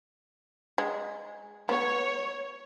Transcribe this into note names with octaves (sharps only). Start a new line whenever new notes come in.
G#3
B3 C#5